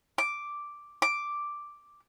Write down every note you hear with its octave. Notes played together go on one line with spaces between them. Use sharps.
D6
D6